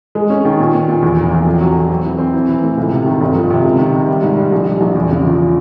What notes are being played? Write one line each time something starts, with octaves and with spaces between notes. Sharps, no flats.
G#3
C#4
D#3
A#2
A#2
A#2
E2
F1
E2
F2
F#3
F#3
C4
E3
C4
E3
E3
A2
C#2
C3
D#3
G1
F3
C3
C#2
D#3
C3
G3
G#2
G3
A#1
G3
A#1
E2
C#3
F3